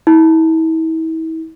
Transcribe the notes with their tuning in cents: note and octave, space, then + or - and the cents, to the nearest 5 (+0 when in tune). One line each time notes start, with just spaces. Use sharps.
E4 -40